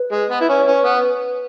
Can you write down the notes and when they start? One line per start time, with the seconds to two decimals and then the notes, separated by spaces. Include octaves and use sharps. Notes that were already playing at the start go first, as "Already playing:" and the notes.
Already playing: B4
0.12 G#3
0.30 B3
0.41 E4
0.49 C#4
0.60 C#5
0.66 C#4 B4
0.85 B3